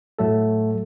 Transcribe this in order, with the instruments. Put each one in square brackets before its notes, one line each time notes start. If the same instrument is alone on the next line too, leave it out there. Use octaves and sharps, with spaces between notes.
[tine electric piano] A2 F#3 A3 A4